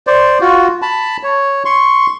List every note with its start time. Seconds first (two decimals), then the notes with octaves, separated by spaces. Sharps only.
0.07 C5 D5
0.41 F4 F#4
0.82 A5 B5
1.23 C#5
1.65 C6 C#6